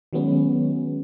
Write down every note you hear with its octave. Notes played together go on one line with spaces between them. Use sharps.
D#3 F#3 G#3 B3 C#4